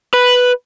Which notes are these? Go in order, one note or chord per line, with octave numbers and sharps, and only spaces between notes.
B4